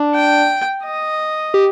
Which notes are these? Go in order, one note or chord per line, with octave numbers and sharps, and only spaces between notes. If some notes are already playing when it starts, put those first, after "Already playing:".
Already playing: D4
G5
D#5
G4